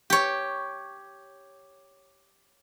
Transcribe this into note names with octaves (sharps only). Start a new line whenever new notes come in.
G4 C#5